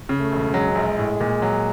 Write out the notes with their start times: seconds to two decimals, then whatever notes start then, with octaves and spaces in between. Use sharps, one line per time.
0.09 C#3
0.20 A3
0.32 E1
0.54 F#3 G#3
0.75 A#1
0.98 A2
1.20 A#2
1.42 F#3